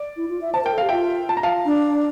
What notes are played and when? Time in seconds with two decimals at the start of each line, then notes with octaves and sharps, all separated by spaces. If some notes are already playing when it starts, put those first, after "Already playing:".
Already playing: D5
0.17 E4
0.29 F4
0.41 E5
0.54 C5 A5
0.64 A#4 G5
0.73 A4
0.78 G4 F5
0.89 F4 E5 G5
1.29 A5
1.37 A#5
1.43 F5 A5
1.66 D4